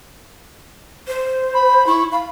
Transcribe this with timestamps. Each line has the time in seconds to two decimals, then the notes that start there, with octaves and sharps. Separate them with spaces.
1.07 C5
1.54 B5
1.87 E4 C#6
2.12 F5 B5